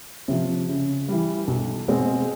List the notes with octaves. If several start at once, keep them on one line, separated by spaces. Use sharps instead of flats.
C3 F3
C#3
E3 G3
B1
B2 G#3 C4